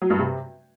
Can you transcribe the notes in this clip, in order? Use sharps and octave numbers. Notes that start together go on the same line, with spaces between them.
F#3
G2
C3